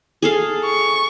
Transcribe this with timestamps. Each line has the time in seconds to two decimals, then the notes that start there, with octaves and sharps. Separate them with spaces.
0.22 G#4 A4 F5
0.65 C#6